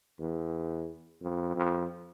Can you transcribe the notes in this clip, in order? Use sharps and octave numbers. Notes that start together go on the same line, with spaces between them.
E2
F2
F2